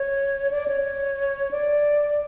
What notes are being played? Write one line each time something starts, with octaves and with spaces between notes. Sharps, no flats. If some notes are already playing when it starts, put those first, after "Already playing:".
Already playing: C#5
D5
C#5
D5